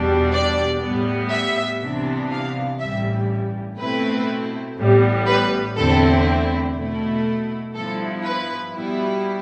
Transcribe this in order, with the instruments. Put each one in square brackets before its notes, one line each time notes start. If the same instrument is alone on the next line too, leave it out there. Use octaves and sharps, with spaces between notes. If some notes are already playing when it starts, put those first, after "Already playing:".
Already playing: [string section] E2 B2 G3 D4
D5
A2 G3 B3
E5
C2 C3 E3 B3 D4
F5
A1 G2 E3 G3 E5
B2 A3 C4 E4 B4
A1 A2 G3 B3
B4
E2 D3 A3 C4 E4 A4
B2 A3 E4
G2 F3 B3 E4 A4
B4
B2 G3 B3 E4